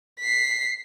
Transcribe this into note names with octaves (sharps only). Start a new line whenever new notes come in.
B6 C7